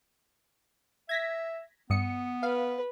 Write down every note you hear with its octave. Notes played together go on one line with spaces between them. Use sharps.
E5 G#6 A#6 B6
G2 B3 D#6 C#7
B4 F5